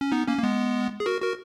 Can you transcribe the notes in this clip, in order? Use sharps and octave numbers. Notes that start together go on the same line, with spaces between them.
C#4
B3 D#4
A#3 C#4
A#3
G#3 B3
G#4
F#4 A#4
F#4 A#4